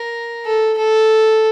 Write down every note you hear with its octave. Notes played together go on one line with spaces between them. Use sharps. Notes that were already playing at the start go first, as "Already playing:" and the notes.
Already playing: A#4
A4
A4